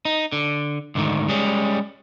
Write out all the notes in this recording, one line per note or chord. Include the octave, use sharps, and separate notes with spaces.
D#4
D3
D2 G#2 D3 D#3
G3 G#3 C#4